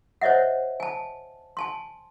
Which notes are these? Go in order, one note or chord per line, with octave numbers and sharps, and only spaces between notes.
C5 C#5 D#5 E5 F#5
G#5 A5
G#5 A5 C6